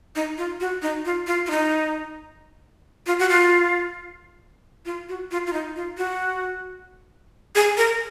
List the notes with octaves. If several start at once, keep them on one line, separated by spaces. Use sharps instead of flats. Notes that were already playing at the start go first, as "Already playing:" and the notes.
D#4
F4
F#4
D#4
F4
F4
F4
D#4
F4
F#4
F4
F4
F#4
F4
F4
D#4
F4
F#4
G#4
A#4